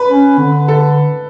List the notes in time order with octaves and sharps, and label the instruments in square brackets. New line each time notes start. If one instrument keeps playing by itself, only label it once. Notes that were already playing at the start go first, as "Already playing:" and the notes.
Already playing: [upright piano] B4
[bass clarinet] C#4
D3
[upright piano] A4